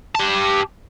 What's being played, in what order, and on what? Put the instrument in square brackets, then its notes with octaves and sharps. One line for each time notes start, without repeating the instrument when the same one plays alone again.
[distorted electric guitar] G4 A5